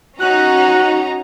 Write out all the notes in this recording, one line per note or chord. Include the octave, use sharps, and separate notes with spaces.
C#4 D#4 F#4 A#5 F#6